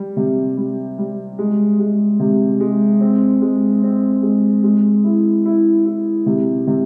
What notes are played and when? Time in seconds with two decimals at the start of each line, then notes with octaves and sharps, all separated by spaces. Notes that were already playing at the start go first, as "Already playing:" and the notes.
Already playing: G3
0.17 C3
0.57 G3
0.98 G3
1.39 G#3
1.80 G#3
2.20 C3
2.60 G#3
3.01 C4
3.42 G#3
3.83 C4
4.23 G#3
4.63 G#3
5.04 E4
5.45 E4
5.86 E4
6.26 C3
6.67 C3